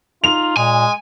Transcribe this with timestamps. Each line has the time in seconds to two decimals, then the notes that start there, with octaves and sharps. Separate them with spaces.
0.24 D#4 F4 F7
0.57 A#2 G#3 G#5